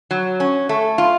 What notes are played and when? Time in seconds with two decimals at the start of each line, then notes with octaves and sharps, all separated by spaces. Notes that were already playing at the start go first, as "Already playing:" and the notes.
0.11 F#3
0.40 C#4
0.69 A3
0.98 F4